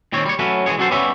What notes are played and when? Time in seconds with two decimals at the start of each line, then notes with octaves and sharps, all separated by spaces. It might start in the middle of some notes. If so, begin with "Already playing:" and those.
0.12 A#2 D#3 C4 C#5
0.26 G3 C#5
0.39 F#3 A3 C#4 B4
0.66 E3 F#3 G#3 G#4 C#5
0.78 F#3 C#4 F#4 A4 C5
0.91 G3 B3 C#4 C#5 E5